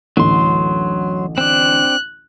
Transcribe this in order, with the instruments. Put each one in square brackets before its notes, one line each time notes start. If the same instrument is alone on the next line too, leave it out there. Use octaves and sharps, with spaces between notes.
[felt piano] A1 D2 [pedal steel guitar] F#3 C6
[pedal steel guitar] C4 D4 [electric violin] F#6